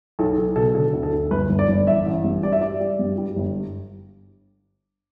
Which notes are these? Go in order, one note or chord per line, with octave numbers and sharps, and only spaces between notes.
B1 A4
B1 A4
B2 A4
D3 A4
D2
A4
D2
G1 B4
G1
D5
G1
A1 E5
A1
G2
G3 D5
E5
G3 D5
G3
G2
G3
G1